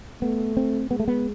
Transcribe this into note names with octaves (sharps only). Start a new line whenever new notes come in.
A3 B3
C4
G#3 B3
A3
B3